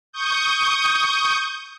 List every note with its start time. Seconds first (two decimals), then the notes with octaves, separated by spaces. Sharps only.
0.12 C#6 D#6 G6